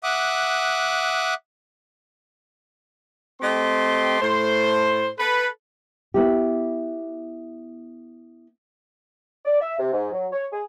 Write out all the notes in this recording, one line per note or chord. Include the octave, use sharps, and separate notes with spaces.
E5 F#5 D6 D#6 F#6
A3 C4 G4 D#5 C6
A2 A3 C5
A4 B4
B3 E4 G4
D5
E5
C3
G#2
F#3
C#5
G#4